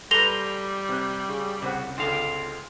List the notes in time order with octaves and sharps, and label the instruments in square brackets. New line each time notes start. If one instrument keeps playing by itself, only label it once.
[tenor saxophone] G3 [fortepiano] A4 B4 [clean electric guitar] C5 A#5 [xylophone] A#6 F7 G7
[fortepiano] C3 F#6
C#3
[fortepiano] C2 C5 F#5 [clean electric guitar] C#3
[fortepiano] C#2 D3 C6 [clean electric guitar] C4 F5